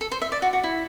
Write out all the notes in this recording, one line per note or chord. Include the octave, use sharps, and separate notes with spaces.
A4
C5
E5
D5
F#4
F#4
E4